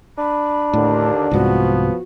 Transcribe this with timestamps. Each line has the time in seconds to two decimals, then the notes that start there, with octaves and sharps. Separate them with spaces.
0.18 D4 B5
0.74 D#2 A2 D3
1.31 C2 G#2 C3 F3 B3 F#4